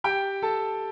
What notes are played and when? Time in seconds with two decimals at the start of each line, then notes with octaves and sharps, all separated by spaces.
0.04 G4 G5
0.42 A4 A5